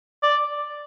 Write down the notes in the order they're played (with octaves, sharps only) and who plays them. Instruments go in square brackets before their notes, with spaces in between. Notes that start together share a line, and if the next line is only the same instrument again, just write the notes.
[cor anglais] D5